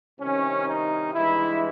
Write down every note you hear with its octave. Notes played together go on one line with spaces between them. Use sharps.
C2 C3 D#3 C#4
D#4
G2 E3 G#3 E4